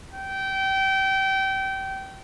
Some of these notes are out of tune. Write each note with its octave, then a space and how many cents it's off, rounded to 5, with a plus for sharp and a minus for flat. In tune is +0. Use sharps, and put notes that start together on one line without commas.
G5 -25